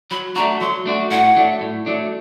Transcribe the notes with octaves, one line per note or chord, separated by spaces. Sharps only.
F#3 B5
A3 D4 F#4 A#5
F#3 C6
A3 D4 F#4
A2 F#5
F#3 A3 D4
A2
F#3 A3 D4